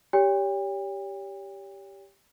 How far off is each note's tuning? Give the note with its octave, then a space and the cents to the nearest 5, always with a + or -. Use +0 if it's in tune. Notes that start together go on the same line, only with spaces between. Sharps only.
G4 +0 C#5 +35 G5 +40